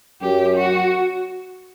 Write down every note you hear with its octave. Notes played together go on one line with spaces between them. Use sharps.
F#2 G4
F#4